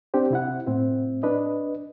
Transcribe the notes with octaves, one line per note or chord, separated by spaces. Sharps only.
C4 D4 G4 C5
C3 E4 F#5
A2 C4 E4
D4 B4 D#5